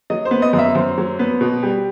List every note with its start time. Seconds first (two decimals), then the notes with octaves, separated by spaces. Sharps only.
0.10 F#3 D#5
0.25 C5
0.31 B3
0.42 D#5
0.53 F#2
0.59 E5
0.75 F#2 C5
0.98 F#3
1.19 B3
1.41 B2
1.63 G3